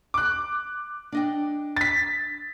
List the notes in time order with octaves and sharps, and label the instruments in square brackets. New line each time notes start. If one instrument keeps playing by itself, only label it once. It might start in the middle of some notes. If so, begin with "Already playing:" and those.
[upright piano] D6 F#6
[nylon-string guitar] D4 D#5 G5
[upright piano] A6 B6